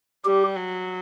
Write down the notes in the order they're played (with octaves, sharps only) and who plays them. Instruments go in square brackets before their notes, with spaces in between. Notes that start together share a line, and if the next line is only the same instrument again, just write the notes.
[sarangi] G3 [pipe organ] G4
[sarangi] F#3